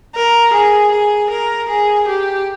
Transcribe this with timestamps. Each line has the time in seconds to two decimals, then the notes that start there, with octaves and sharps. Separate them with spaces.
0.15 A#4
0.53 G#4
0.92 G#4
1.30 A#4
1.69 G#4
2.07 G4